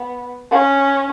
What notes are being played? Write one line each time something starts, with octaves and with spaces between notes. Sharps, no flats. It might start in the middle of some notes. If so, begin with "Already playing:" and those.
Already playing: B3
C#4